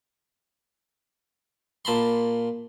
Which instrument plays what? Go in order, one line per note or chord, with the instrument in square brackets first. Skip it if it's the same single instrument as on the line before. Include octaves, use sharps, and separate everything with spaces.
[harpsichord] A#2 A5 B5 C6